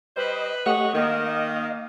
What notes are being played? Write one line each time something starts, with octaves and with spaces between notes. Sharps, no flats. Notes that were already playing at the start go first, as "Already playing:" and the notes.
G3 B4 C5 D#5
A3 G4 C#5 D#5 F#5
D#3 A#3 D#5 F5